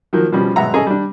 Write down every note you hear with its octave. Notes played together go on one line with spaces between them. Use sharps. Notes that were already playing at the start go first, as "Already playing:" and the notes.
D#3 F3 F#3 A#3
B2 F3 G3 C#4
G#1 B2 F#3 E5 F#5 A#5
C#4 G#4 A4 D#5 A#5
G3 D4